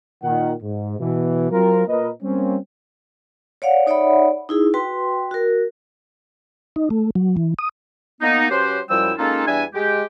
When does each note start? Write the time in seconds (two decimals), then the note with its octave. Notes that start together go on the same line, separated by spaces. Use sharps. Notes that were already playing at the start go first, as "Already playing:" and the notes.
0.23 A#2 D#3 F#5
0.62 G#2
1.00 B2 E3
1.51 F#3 C4 F4 A#4
1.88 A#2 A#4 B4 D#5
2.23 G3 A#3 C4 C#4
3.62 C#5 D5 F5 F#5
3.87 D#4 C#5 D5 E5 F#5 B5
4.49 D#4 E4 G#4
4.74 F#4 B4 G5 C6
5.31 F#4 A#4
6.76 D#4
6.90 A3
7.15 F#3
7.37 E3
7.59 D#6
8.21 A#3 B3 D#4
8.50 F#3 C#4 G4 B4 C5
8.89 F#2 F3 G3 E4 G5 E6
9.18 G#3 A#3 C#4 D#4 F4 A4
9.47 E2 G3 D4 E5 G#5
9.74 G#3 G4